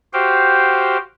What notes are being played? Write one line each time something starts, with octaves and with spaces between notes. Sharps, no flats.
F#4 G4 C5 F5 G5